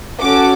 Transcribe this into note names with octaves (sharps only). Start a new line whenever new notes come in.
C#4 F#4 A4 D6